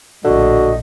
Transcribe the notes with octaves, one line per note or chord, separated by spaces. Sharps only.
A#1 A2 D3 F#4 D#5